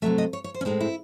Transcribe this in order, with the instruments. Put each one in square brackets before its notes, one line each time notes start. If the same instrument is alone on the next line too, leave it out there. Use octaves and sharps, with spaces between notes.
[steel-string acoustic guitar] C3 F#3 A3 E5
D#5
C#5
C#5
C5
C#4
A2 G#3 C4 D#4
E4